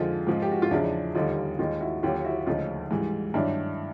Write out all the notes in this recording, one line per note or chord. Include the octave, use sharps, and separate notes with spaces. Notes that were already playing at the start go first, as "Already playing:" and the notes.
Already playing: F2 D3 F3 G#3 D#4 F4
G#2 F3 G#3
G4
F#4
F4
E2 C#3 F3 G#3 D4 E4
D#2 D3 G3 D#4 F4
D#2 D#3 G#3 D#4 F4
E4 F#4
D#2 D3 F#3 F4 G4
E4 F#4
D2 C#3 F3 G#3 D#4 F4
G#2 E3 G3
G2 D#3 F#3 D4 E4